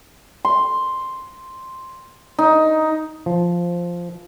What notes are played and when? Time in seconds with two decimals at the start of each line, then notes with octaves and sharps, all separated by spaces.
0.45 C6
2.39 D#4
3.26 F3